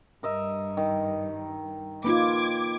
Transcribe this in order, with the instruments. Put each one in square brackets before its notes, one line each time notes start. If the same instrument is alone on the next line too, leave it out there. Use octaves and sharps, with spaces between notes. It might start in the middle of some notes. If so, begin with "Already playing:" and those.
[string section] G2 [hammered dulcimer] A#4 D#5 E5
[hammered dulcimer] D#3
[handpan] A#3 D#4 F4 [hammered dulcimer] B4 [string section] D6 G#6